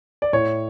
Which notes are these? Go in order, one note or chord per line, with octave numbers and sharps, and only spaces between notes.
D5
A2 C#5